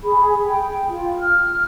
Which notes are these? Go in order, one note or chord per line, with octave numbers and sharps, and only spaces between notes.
G#4 B5
G5
F4
F6